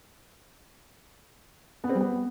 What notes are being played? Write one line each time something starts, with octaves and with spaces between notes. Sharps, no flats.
B3
C4
G3
B3